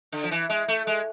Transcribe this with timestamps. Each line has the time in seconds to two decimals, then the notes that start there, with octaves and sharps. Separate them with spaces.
0.12 D3
0.23 F3
0.31 E3
0.50 G#3
0.68 A3
0.87 G#3